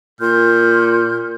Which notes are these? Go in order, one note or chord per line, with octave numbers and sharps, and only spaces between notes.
A#2 C6 F6 G6